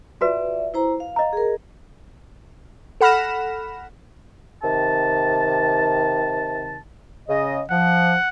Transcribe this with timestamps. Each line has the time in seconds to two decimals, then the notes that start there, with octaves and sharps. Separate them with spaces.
0.21 F4 F#4 B4 D5 E5
0.74 E4 C5 A#5
1.00 F5
1.16 D#5 A#5
1.33 G#4 A#4
3.01 A4 F#5 B5 F6 A#6 E7
4.63 C3 D#3 A5
7.28 C#3 D#5
7.70 F3 F#5